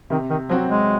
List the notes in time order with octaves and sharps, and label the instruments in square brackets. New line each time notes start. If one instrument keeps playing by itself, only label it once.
[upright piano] C3 [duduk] D#3
[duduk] D#3
[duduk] F3 [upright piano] F#3 C4 F#4
[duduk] G#3